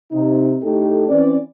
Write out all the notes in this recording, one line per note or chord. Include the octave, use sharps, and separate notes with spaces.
C3 D#4
A2 D#4 G4 A4
E3 C4 C#4 B4 D5